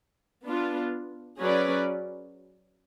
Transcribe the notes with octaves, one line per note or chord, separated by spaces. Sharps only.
B3 D4 F4
F#3 C#4 G#4 B4 D5